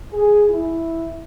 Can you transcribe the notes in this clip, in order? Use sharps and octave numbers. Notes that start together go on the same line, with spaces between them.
G#4
E4